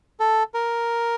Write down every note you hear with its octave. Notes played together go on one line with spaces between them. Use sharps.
A4
A#4